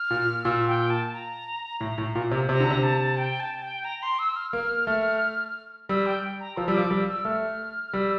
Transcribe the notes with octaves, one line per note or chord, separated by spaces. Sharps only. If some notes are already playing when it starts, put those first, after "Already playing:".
Already playing: F6
A#2
A#2 E6
G5
A5
A#5
A2 A#5
A2
A#2
C3
C3 A#5
D3
C3
A5
G5
A5
G5
A#5
C6
E6
F6
A#3 F6
A3
G3 E6
G5
A#5
F3 E6
G3 E6
F3 D6
G3 E6
E6
A3 F6
G3 E6